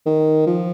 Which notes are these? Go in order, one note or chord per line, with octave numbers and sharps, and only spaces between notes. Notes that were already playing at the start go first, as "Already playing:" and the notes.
D#3
F3